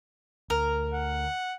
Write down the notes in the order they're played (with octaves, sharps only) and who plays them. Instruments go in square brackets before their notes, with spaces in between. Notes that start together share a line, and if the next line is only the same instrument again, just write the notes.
[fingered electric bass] D2 [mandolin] A#4
[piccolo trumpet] F#5